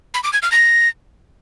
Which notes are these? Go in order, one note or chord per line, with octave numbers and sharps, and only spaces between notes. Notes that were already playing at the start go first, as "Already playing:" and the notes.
B5
D6
G#6
F6
A#6